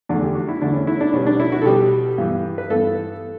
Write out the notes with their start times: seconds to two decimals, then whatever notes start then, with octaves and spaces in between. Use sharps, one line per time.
0.09 E2 D3 A3 D4
0.22 G4
0.35 F#4
0.48 E4
0.62 E2 D3 A3 D4
0.74 C#4
0.87 E4
1.01 D4
1.13 B2 G3 B3 C#4
1.26 D4
1.40 E4
1.52 F#4
1.62 A4
1.65 B2 G3 B3 G4
2.18 G2 E3 B3
2.58 B4
2.70 G2 E3 B3 A4